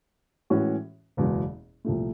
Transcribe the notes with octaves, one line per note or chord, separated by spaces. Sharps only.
A2 E3 G#3 C#4 F#4
F#1 E2 B2 G#3
C2 A#2 F3 A3